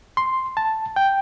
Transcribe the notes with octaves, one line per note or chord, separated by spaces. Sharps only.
C6
A5
G5